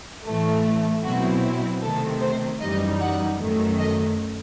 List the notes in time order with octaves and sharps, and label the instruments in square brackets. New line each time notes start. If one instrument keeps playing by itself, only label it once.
[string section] A2 E3 A3
B2 F#3 C4 E4 F#4
C3 D#3 A3 C4 A4
C5
F#2 E3 G3 D#4 D#5
F#5
F#2 D#3 A3
D#5